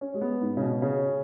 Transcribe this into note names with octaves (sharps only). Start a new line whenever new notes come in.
C#4
G#3
B3
G#2
C#3
B2
C#3